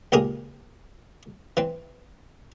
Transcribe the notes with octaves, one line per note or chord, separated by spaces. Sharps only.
C#2 A#2 G4 G#4 A#4 D#6
E3 C4